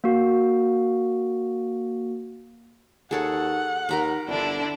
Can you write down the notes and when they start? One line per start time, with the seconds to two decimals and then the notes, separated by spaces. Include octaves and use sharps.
0.04 A#3 F#4
3.11 D#2 G#4 A4 C#5 F#5
3.89 D#2 A#4 A#5 B5
4.27 G1 D3 D4 E4